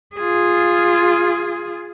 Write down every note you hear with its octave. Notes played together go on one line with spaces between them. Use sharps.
F4 G#4